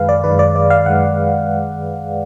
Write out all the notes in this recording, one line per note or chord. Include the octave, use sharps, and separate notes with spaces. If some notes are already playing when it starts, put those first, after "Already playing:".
Already playing: F#2 D#3 G#3 G#4 B4 F5
D5
F#2 D#3 G#3 B4
D5
D5
F5
F#2 D#3 G#3 F#5